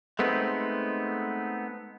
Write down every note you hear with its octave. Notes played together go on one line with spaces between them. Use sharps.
G#3 A3 B3 C4 D#4